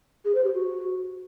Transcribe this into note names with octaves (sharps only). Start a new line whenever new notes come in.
G#4
C5
G4
F#4